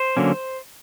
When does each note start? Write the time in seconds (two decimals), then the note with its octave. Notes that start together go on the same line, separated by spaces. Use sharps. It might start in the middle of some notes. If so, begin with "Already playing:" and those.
Already playing: C5
0.17 D3 F#3 A#3 C#4